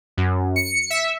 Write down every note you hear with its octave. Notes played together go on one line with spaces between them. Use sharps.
F#2
C#7
E5